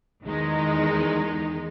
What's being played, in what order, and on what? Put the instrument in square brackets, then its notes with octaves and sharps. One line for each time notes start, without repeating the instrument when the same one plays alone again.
[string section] E2 D#3 G#3 D#4